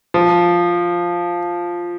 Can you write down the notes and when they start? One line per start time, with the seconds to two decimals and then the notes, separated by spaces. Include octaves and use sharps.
0.14 F3